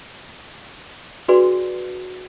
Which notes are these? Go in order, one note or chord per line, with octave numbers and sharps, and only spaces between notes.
D4 F#4 G#4 B4 D5 C6